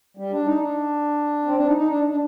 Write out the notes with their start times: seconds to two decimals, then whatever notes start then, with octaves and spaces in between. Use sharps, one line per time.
0.17 G3
0.32 D4
0.46 D#4
0.60 D4
1.45 C4
1.56 D4
1.67 D#4
1.77 D#4
1.88 D4
2.10 D4